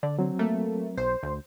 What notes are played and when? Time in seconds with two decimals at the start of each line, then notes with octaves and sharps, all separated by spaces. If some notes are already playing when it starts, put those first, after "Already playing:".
0.03 D3 D5
0.19 F#3 C4
0.39 A3 A#3
0.97 B1 C5
1.23 D2